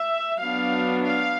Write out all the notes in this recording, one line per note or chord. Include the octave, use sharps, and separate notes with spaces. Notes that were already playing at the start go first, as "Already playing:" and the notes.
Already playing: E5
F#3 B3 D4 F5
F5